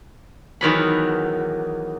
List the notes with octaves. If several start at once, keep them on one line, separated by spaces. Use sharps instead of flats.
E2 D#3 F#3 B5